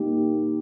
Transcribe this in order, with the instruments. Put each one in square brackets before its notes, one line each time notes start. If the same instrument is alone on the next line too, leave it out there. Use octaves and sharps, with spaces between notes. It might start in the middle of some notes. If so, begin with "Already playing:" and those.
Already playing: [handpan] A#3 D#4 G4